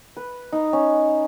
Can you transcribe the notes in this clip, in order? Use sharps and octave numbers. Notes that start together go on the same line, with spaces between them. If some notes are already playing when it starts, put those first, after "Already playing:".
B4
D#4
C#4